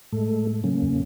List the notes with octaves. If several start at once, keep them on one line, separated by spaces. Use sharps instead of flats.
A2 G#3 A3 A4
C#3 F#3 A#3 C#4
E2